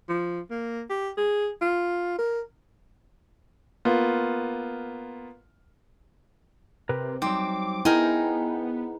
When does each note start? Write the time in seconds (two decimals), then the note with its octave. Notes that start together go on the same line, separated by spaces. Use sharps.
0.09 F3
0.50 A#3
0.90 G4
1.17 G#4
1.62 F4
2.19 A#4
3.85 A#3 B3 F4
6.89 C3 G4 A#4 B4
7.22 F#3 G3 C4 D#4 D6
7.85 B3 D#4 E4 G#4 A#4 G5